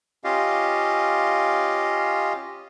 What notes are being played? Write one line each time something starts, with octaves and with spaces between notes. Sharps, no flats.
C#4 F4 G4 D#5 F5